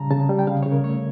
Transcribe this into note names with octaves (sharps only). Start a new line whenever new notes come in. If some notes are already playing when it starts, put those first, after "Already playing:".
Already playing: C#3 G3 A5 A#5
C#3 A5
G3
G5
C#3 F5
C#3 C#5
A#4
A3 C#5